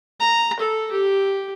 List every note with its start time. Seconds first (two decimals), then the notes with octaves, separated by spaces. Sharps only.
0.20 A#5
0.60 A4
0.91 G4